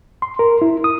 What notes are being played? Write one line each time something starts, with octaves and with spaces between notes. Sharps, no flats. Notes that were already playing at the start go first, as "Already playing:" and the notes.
C6
A#4
E4
D#6